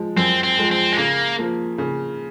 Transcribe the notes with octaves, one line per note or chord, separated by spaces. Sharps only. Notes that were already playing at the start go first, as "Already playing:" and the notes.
Already playing: F3 G#3
F#2 C4
C4
F3 G#3
C4
G#3
C#3 A#3
F3 A#3
C#3